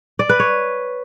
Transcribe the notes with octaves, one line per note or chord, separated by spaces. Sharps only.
D5
B4
C#5